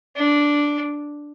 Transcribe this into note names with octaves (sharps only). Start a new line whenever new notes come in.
D4